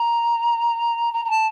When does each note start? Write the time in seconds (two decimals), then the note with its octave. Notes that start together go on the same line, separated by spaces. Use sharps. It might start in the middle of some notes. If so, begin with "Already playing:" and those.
Already playing: A#5
1.13 A#5
1.24 A#5
1.29 A5